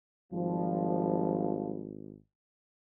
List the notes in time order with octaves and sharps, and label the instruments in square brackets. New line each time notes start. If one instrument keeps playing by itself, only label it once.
[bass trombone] G#1 [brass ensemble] F3 G3